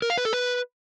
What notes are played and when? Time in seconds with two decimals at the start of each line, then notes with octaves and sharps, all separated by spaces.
0.02 A#4
0.10 F5
0.18 B4
0.25 A4
0.33 B4